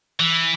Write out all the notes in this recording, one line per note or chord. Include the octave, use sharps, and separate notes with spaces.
E3